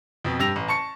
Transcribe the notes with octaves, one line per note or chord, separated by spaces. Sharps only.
F2 B2
G2 G4 E6 A#6 F7
A1
A5 C#6 C#7